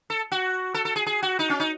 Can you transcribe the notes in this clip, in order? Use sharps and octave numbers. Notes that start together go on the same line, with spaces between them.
A4
F#4
A4
A4
G#4
G#4
F#4
D#4
C#4
D#4